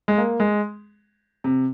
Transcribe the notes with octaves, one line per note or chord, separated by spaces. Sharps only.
G#3
A#3
G#3
C3